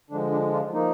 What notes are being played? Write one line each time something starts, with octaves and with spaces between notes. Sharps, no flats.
D3 F3 G#3 D4
D4
D4 F4
F3 A#3 D#4